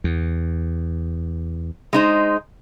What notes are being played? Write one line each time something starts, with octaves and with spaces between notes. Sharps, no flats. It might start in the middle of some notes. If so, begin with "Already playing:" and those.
E2
G#3 D#4 C5